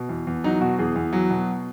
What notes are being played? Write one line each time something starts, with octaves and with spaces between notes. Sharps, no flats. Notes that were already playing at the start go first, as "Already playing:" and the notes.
Already playing: B2
E2
E2
F#3 D#4
B2 F#4
E2 G#4
E2
F#3
B2